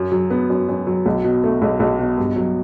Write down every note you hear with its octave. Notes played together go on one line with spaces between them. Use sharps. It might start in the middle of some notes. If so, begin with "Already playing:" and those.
Already playing: F#2
F#3
B3
F#2
F#2
F#3
B1
B2
A3
B1
B1
B2
G2
F#3